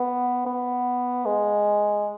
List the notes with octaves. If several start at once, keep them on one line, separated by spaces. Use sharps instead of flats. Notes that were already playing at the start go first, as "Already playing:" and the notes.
Already playing: B3
B3
G#3